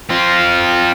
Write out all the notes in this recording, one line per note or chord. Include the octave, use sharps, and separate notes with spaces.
C4 F4